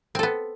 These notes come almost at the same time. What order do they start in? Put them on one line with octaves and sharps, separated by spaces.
C4 A4 B3